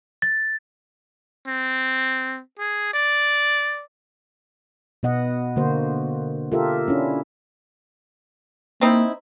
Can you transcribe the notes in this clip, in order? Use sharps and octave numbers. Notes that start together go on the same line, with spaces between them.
A6
C4
G#4
D5
B2 B3 D#5 F#5
D3 A#3 F#4 C5
F4 G4 A4 A#4 E5
C#4 D4 E4
A#3 C4 D#4 E4